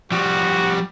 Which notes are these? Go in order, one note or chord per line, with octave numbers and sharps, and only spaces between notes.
F3 G3 F#4